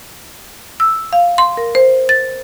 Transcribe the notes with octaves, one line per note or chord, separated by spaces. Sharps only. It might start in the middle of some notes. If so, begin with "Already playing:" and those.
E6
F5
C6
A#4
C5
A6